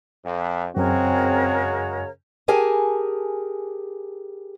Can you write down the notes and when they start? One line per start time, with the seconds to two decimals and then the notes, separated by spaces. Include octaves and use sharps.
0.24 F2
0.77 F#2 C#3 G#3 C4 F#4 A#4 C#5
2.48 G4 G#4 A#4 G#5 A5